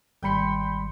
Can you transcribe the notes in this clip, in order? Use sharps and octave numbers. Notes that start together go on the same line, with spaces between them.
G#1 G3 G5 B5 C6 C#7